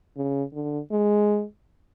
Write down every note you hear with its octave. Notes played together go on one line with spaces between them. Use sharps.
C#3
D3
G#3